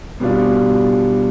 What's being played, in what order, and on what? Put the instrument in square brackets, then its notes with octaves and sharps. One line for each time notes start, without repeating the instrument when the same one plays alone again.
[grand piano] B2 G3 D4 F4